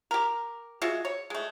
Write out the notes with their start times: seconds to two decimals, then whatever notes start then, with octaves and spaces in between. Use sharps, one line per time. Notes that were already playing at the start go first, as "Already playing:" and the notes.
0.11 G4 A#4
0.82 G#3 F4 F#4 E5
1.05 C#5
1.30 G#3 A3